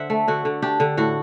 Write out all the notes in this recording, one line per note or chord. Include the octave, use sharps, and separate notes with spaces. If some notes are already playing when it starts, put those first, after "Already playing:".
Already playing: D3 C5 E5 F#5
A3
D3 F#4
D3
D4 G4
D3
A2 F#4